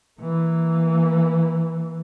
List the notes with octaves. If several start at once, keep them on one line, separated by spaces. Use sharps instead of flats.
E3 A#3